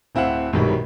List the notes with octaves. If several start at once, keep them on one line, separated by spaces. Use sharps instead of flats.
D1 C4 E4 F5 F#5
A#1 G#2 B2 D#3 F#3 G3